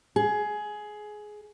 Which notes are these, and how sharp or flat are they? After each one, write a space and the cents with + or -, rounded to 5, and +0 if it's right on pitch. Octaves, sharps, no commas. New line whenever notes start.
G#4 +15